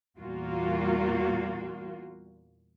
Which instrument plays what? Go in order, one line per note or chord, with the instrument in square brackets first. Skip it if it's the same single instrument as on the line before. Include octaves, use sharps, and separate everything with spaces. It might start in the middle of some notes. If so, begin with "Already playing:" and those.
[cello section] E2 A#2 G3 A#3 F4 F#4